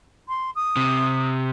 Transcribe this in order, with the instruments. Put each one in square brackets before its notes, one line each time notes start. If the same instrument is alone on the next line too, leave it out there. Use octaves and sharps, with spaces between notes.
[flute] C6
D#6
[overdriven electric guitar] C3